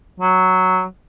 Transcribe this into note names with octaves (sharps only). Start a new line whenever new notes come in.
F#3